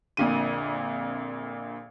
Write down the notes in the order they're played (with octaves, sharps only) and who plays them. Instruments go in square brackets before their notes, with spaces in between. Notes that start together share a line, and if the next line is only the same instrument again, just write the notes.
[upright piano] A#1 F2 A#2 D3 D#7